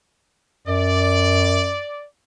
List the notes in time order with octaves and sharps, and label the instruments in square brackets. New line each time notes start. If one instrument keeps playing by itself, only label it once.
[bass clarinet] F#2 [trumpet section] D5